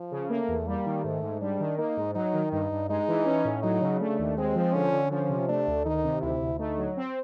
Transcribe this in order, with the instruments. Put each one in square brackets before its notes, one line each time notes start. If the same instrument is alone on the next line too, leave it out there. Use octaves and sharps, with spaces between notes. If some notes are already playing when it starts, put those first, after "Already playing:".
Already playing: [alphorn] F3
[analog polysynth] C#3
[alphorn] A3 [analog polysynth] A#3
[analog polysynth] E2
[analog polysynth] G3 [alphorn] A#3
[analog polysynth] D#3
[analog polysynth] G#2 [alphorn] A3
[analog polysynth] G#2
[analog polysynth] G3 [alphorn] D4
[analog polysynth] D#3
[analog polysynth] A#3 [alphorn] D#4
[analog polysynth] G#2
[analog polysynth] F#3 [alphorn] D#4
[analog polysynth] D#3
[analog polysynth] G2 [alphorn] D#4
[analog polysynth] G2
[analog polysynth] G#3 [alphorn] D#4
[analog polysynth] E3
C#4
A2
[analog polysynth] F#3 [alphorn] D#4
[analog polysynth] C#3
[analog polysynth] A3 [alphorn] D4
[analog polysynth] D#2
[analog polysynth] G#3 [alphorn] C4
[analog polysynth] F3
[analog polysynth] D3 [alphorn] C#4
[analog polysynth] D3
[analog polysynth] F3 [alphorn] C#4
[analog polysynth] C3
[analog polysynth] A3 [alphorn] D4
[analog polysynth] D2
[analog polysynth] D#3 [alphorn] D#4
[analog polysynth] C3
[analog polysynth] D2 [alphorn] E4
[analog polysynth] D2
[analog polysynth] A3 [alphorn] D#4
[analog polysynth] F#3
C4